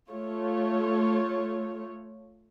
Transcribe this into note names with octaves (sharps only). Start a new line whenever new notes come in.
A3 F4 C#5